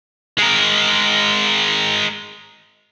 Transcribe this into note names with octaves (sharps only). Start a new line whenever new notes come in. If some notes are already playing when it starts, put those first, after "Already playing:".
G#3 A#4